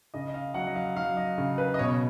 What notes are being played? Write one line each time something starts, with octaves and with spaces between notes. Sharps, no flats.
C#3 D#5
D#5
F5
F#3 F#5
D#5
F5
F#3 F5
D#5
C#3
B4
D#5
B2 C#5